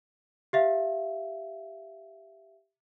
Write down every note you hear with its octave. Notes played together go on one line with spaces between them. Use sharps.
G4 E5 F5